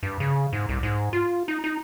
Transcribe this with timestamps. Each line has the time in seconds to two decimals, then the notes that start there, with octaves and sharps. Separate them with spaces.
0.03 G2
0.20 C#3
0.53 G#2
0.69 C2
0.83 G#2
1.13 F4
1.48 D#4
1.64 D#4